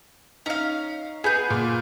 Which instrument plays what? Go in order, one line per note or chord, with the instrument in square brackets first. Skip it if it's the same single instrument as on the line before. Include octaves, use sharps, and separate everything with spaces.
[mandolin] C#4 F5 [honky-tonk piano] D#4
[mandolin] B3 G6 [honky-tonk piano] G#4 D#7
[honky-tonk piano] A#2 F4